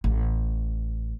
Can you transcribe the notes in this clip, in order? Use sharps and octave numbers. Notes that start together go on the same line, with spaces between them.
A1